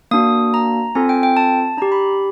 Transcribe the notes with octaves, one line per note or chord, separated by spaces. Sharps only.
A#3 D4 F#4 D#6
A#5
C4 F4 A4 G#5
G5
G5
A5
D4 G4 A#5
B5